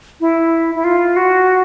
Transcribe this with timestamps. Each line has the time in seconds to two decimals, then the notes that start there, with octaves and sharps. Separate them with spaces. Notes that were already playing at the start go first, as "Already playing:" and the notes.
0.21 E4
0.75 E4
0.84 F4
1.16 F#4